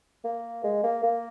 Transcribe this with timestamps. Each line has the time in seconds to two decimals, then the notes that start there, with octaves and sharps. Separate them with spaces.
0.24 A#3
0.64 G#3
0.84 A#3
1.04 A#3